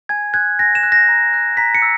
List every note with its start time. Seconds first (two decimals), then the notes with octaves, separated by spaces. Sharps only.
0.09 G#5 G#6
0.34 F#6 G#6
0.59 G#5 A#6
0.75 E7
0.83 F#6
0.92 A#6
1.08 A#5
1.34 F#6
1.57 A#5 B6
1.74 C#7
1.82 E6